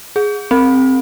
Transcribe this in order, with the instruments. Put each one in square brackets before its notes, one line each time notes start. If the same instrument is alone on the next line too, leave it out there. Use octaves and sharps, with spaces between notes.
[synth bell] G#4
C4